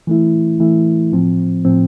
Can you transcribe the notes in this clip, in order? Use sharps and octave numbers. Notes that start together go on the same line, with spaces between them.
E3 A3 E4
E3 A3 E4
A2 F3 C4
A2 F3 C4